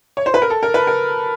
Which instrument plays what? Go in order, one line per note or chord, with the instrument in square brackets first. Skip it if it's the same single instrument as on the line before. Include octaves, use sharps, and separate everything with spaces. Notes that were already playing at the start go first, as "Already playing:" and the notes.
[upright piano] C#5
C5
B4
A#4
A4
A#4
B4
A#4